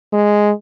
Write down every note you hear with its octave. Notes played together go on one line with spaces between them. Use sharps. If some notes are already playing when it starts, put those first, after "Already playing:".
G#3